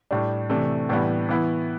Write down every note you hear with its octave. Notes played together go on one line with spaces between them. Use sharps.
A2 G3 D4
C3 E3 A3 D4
A2 E3 G3 B3 D4
E3 B3 E4